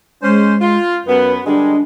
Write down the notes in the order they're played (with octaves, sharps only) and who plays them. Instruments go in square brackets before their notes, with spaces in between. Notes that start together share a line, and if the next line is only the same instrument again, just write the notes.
[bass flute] G#3 [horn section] C#4 C5
[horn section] F4
[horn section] F#2 B3 [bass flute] B4
[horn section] D3 G3 G#3 [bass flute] D4